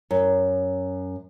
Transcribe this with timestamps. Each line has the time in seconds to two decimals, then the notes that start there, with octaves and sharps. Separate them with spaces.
0.11 F#2